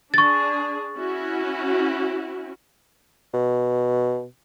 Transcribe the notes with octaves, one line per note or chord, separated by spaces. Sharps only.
D4 G#4 C#6 A6
C#4 E4 F#4
B2